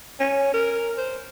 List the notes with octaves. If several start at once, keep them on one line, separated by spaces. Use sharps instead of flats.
C#4
A#4
C5